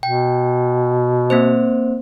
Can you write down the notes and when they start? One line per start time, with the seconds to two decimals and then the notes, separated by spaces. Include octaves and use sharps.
0.03 B2 G5
1.30 A#3 C4 C5